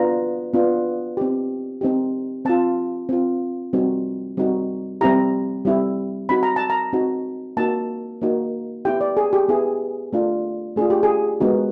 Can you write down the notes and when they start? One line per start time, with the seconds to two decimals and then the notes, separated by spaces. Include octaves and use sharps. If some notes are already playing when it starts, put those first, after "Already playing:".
Already playing: B3 D4 F4 A#5
0.54 B3 D4 F4
1.17 C4 D#4 G4
1.81 C4 D#4 G4
2.45 C4 F4 A5
3.09 C4 F4
3.73 G3 C4 D#4 F#4
4.37 G3 C4 D#4 F#4
5.01 G3 C4 E4 G4 A#5
5.65 G3 C4 E4 G4
6.29 C4 D#4 F#4 B5
6.43 A#5
6.56 A5
6.70 A#5
6.93 C4 D#4 F#4
7.57 A#3 D#4 F#4 A5
8.21 A#3 D#4 F#4
8.85 B3 E4 G4 G5
9.01 D5
9.17 G#4
9.33 G4
9.48 B3 E4 G4 G#4
10.13 A3 D4 F4
10.76 A3 D4 F4 G#4
10.90 G4
11.03 G#4
11.40 G#3 B3 D#4 F#4